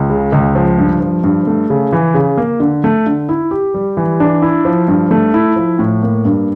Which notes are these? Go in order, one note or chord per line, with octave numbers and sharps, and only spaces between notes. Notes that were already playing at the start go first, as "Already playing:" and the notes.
Already playing: C#2
C#3
C#2
F3
G2
F3
G2
A3
C#3
E3
C#3
A#3
D3
A3
D3
E4
G4
G3
E3
D4
E4
F3
G2
A3
E4
F3
A2
A#3
G2